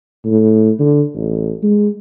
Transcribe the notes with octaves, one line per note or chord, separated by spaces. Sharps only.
A2
D3
A1
G#3